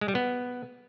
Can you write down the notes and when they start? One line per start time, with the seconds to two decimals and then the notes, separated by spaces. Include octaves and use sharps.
0.01 G#3
0.08 G3
0.15 B3